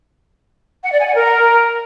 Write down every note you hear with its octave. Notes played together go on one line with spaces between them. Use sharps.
F#5
D5
G#5
F#5
A#4